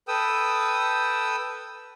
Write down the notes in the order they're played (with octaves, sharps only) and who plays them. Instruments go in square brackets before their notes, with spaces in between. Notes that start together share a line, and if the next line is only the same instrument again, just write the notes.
[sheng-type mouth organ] A4 B4 G5 D#6 E6